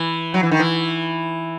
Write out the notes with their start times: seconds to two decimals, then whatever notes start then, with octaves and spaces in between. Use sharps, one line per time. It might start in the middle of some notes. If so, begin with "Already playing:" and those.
Already playing: E3
0.34 F#3
0.43 E3
0.51 D#3
0.60 E3